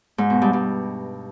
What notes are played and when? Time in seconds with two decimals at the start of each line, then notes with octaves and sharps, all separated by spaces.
0.18 G#2
0.30 B2
0.42 G2
0.53 G2